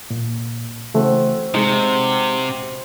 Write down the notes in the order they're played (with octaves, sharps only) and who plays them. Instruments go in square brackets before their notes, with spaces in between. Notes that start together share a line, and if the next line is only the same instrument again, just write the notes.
[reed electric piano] A#2
[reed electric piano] C#3 E3 A3 [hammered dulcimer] C4 F#4
[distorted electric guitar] C3 [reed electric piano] G#3 D#4